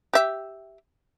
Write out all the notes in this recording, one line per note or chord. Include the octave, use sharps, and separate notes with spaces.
G4 E5